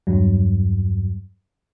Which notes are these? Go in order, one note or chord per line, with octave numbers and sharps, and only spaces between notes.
E2 G2 F#3